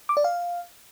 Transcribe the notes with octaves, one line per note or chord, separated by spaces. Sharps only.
D6
D5
F5